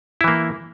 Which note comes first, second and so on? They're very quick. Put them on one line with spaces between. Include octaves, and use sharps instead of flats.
E4 E3 A#3